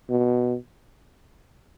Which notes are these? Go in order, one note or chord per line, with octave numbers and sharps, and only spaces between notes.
B2